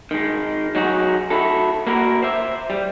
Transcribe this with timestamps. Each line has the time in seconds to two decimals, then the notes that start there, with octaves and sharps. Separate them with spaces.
0.11 D#3 G#3
0.75 F#3 D#4 F#4 G#4
1.30 E4 F#4 A4
1.87 A#3 E4 F#4 A#4
2.22 C5 E5
2.70 G3